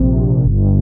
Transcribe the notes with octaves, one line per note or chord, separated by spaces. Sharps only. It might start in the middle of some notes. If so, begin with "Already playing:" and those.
Already playing: A#1 C3
A#1
G1